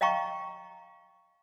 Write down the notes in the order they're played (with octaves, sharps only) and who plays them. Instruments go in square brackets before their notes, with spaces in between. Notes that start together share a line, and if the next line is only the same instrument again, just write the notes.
[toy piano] D#5 F5 G5 A#5 C#6